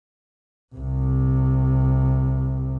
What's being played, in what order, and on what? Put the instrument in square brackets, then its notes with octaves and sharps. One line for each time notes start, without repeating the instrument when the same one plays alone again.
[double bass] C2 C3